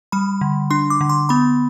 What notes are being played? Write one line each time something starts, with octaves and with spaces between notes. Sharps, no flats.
G3 B5
D3
D4 C6
D6
D3
C6
B3 B5